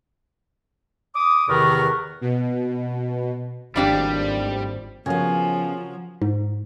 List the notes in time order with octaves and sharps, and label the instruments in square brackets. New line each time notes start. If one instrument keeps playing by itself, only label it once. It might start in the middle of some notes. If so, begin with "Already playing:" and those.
[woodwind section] D6 D#6
E2 C3 D#3 B3 A#4 C#6
[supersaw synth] B2
[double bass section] G#1 [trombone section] D#2 A2 C5 [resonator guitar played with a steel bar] F3 D4 G4 [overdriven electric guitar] G3
[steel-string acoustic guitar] C#3 B3 [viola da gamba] F3 [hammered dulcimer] F#3 A#4 G#5
[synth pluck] G#2